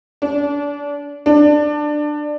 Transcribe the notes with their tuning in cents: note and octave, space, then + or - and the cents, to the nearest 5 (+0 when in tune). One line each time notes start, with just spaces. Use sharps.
D4 -30
D4 +15